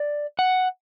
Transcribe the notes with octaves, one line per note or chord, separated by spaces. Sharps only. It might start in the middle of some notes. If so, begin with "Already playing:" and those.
Already playing: D5
F#5